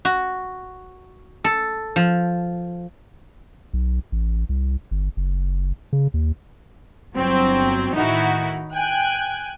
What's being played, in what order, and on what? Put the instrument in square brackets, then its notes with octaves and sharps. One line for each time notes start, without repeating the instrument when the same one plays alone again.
[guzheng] F#4
A4
F3
[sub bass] B1
A1
C2
G1
F#1
C#3
D#2
[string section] G1 F#3 C4
A2 D#3 D#4 E4 F#4
G5 G#5 F#6